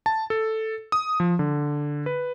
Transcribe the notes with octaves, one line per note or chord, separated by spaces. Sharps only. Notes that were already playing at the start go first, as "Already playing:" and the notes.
A5
A4
D#6
F3
D3
B4